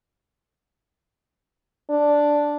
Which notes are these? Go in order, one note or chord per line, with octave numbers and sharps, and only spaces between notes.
D4